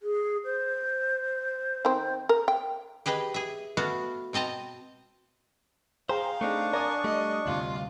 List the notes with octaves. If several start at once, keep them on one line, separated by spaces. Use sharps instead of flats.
G#4
C5
D#3 C4
A#4
G5
G4 G#4 B4 D#5
G#4 E5
A3 B3 F#4 F5
B2 C4 D#5 A5 A#5
G#4 C5 F5 G5 A#5
A3 C4 D4 D#4 C#6
A#4 D5 G#5 D#6
G3 A3 D#5
D2 G2 C3 F4